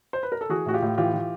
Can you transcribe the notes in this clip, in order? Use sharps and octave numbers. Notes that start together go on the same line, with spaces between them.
C5
B4
A#4
A4
E3 F#4 G#4
A2 F#4
F4 G4
A2
E3 F4 G4
E3